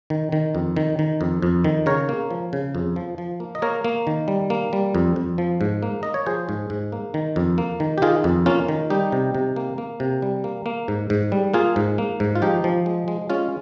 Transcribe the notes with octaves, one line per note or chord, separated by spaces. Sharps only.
D#3
D#3
F2
D#3
D#3
F2
F2
D#3
C#3 A#4 C#5
A#3
F3
C#3
F2
F3
F3
A#3
D#5
A#3 A#4 C#5
A#3
D#3
G3
A#3
G3
F2
F2
F3
G#2
A#3
A#3 D#5
C#5
F3 G#4 C5
G#2
G#2
A#3
D#3
F2
A#3
D#3
G4
D#3 F4 G#4
F2
A#3 C#4 F4
D#3
G3 D#4 G4
C3
C3
A#3
A#3
C3
G3
A#3
A#3
G#2
G#2
G3
A#3 F4 G#4
G#2
A#3
G#2
F4
F3 D#4 G4
F3
G#3
G#3
G#3 C#4 F4